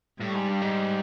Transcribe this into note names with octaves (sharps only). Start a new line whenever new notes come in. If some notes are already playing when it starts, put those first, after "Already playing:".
A2 G3
G#2
G2
G#2